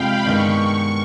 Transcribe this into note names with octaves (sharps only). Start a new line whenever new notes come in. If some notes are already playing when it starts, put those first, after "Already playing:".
Already playing: F2 C3 F3 G#3 F5 G5 B5
G2 D#3 G#3 B3 C#6